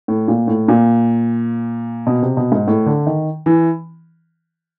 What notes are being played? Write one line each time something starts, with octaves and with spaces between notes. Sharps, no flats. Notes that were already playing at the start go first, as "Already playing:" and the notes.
A2
A#2
A2
A#2
B2
C3
B2
G#2
A2
D3
D#3
E3